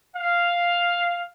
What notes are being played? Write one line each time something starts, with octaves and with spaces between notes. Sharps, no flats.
F5